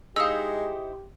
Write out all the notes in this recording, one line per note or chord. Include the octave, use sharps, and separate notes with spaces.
G#3 D#4 E4 G4 C5 F5 E6